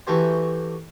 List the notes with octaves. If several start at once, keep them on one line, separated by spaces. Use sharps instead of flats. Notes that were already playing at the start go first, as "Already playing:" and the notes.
E3 A3 F#4 G4 C5